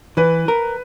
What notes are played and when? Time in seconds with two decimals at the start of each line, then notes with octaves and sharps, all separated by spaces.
0.17 E3 B4
0.48 A#4